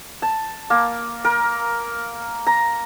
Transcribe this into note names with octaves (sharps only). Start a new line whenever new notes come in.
A5
A#3
A#4
A#5